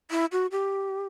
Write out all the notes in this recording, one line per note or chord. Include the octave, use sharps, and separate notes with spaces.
E4
F#4
G4